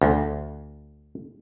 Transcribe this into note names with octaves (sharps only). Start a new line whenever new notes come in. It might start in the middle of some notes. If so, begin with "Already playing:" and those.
D2